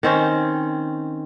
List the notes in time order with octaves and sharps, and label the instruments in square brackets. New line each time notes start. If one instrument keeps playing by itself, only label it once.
[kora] D#3 C4 C#4